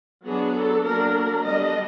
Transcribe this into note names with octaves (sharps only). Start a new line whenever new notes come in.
F#3 B3 D4 G#4
A4
F#3 A#3 D4 A#4
D3 G3 B3 D4 D#5